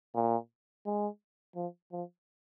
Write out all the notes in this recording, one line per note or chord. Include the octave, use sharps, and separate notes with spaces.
A#2
G#3
F3
F3